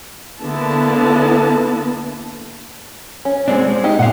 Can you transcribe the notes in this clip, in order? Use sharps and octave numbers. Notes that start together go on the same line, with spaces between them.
D3 A#3 B3 E4 A5
C#4
G#3 C4 D4
G#3
D#4 G4
A#2 F5 F#5